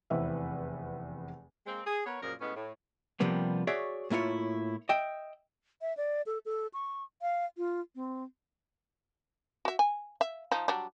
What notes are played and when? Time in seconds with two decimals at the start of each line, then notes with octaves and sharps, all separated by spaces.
0.10 F1 E2 C4 E4 B4 E5
1.66 G#3 A#3 C4
1.87 G#4
2.06 B3 A#4 C#5
2.22 F#2 A#2 F3 G#4 A#4
2.41 A2 G#3 B3 C#4
2.56 A2
3.20 C3 F3 G3 A#3 B3
3.67 F#4 G#4 C#5 D5 E5
4.10 A2 A#3 E4 F4 C#5
4.89 D#5 E5 G5
5.81 E5
5.97 D5
6.26 A4
6.45 A4
6.74 C#6
7.22 F5
7.57 F4
7.95 C4
9.65 F#4 E5
9.79 G#5
10.21 E5
10.52 F3 D#4
10.68 F#3 G3 D4